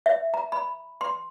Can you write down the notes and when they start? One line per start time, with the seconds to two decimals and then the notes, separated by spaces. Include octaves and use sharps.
0.06 E5
0.34 A#5
0.52 B5
1.01 C6